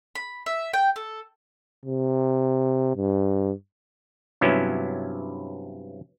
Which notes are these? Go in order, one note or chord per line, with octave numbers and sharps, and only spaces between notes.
B5
E5
G5
A4
C3
G2
G2 C3 F#3 B3 C#4 E4